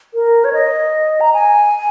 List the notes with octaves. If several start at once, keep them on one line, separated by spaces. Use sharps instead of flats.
A#4
C#5
D#5
A#5
G#5